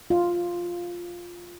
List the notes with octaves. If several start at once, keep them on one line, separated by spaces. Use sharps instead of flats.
F4